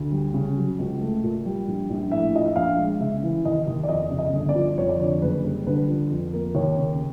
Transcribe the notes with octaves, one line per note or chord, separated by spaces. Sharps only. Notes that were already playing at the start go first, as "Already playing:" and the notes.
Already playing: D2
G3
C#3
F#3
C#2
A3
A#2
G3
A#1
A#1
A2 E5
F3 D#5
E5
A#1 F5
G#3
C#3 E5
E3
D#2 D#5
D#2
D5
F2 D#5
C#3
D#5
G1
D5
F3
F2 C#5
D5
D3 C#5
F#1 B4
G3
D3 B4
F3
F2
A#3
D#2 C#5
C#3